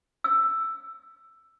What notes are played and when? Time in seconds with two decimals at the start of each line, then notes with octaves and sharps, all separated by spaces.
0.24 E6